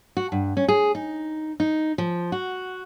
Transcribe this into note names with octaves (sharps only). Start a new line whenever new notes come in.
F#4
G2
C#4
G#4
D#4
D#4
F3
F#4